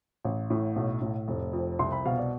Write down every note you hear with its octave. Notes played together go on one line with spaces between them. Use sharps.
A1
A2
B1
A2
F1
F2
C2 C6
B5
B2 F5
D5